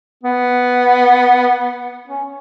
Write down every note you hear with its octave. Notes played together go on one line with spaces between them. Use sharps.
B3
C#4